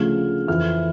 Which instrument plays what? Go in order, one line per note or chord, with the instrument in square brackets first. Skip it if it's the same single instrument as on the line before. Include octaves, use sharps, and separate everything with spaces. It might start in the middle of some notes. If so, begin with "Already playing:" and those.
Already playing: [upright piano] D2 C#3 F3 F6
F2 E3 F6